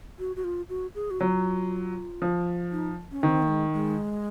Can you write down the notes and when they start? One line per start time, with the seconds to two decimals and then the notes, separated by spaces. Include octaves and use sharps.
0.19 F#4
0.36 F#4
0.44 F4
0.69 F#4
0.95 G#4
1.11 F#4
1.20 F#3 F4
2.22 F3
2.72 D#4
3.12 C#4
3.22 D#3 C4
3.42 A#3
3.48 G#3
3.73 G#3